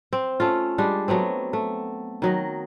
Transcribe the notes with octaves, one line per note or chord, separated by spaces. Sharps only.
C4
A3 C#4 F4
G3 G#3 D4
F#3 A3 B3 C4
A3
D#3 F#3 D#5